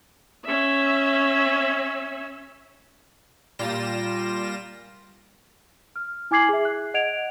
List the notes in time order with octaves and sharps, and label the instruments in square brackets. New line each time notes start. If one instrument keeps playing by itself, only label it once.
[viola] C#4 E5
[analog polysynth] A#2 G3 F4 G5 A#6 E7
[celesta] F6
E4 G#5 D6 G#6 C7 F#7
G#4 E5
F#6
D#5 F#5 G#6 D7 F7